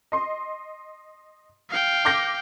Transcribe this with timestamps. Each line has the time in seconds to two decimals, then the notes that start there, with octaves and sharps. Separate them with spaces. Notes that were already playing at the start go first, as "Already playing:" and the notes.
0.12 D#5 C6
1.70 F5 G5
2.05 D6 G6 A#6